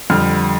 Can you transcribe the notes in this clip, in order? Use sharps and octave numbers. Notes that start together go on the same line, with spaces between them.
F2 D3 G3 F6